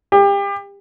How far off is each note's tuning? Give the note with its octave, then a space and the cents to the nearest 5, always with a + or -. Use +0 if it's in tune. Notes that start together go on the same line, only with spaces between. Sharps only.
G4 +30